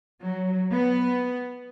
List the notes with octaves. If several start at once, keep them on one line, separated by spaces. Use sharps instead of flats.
F#3
B3